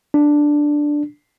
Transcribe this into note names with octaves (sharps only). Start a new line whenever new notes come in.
D4